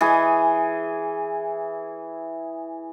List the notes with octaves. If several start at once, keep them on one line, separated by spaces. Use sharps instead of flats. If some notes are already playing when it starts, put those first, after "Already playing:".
E3 G#4 G#5